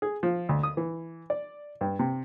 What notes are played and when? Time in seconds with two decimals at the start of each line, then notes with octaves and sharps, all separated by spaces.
0.02 G#4
0.23 F3
0.49 D2
0.63 D#6
0.77 E3
1.30 D5
1.81 G2
1.99 C3